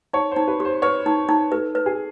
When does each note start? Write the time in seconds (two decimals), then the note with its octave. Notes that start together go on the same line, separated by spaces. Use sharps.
0.13 D#4 C#5
0.31 D#4 C5
0.48 B4
0.60 G4 C5
0.82 B4 C#5
1.06 D#4
1.29 D#4
1.52 A4 B4
1.75 B4
1.86 G#4